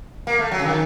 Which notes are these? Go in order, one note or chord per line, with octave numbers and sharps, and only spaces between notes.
A#3
A3
F#3
C#3
D#3